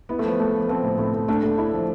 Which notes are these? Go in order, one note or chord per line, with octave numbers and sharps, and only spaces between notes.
B3 E4
A3
F3 B3
A3
F3
F3 C4
A2
A2
A2
A3 D4
A3
E4
F3